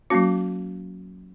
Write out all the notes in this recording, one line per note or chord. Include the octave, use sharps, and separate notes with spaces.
F#3 A#3 C#4 F#4